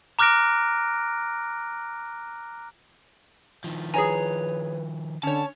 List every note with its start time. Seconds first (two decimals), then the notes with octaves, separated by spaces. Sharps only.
0.19 A#5 D6 F6 F#6 A#6 D7
3.64 D#3 F3
3.94 G#4 B4 C#5 G#5 A#5
5.23 D3 C#4 C#5 A5